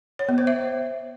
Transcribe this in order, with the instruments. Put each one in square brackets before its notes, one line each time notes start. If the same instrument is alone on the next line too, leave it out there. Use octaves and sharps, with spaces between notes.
[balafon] C#5
B3
C5
E5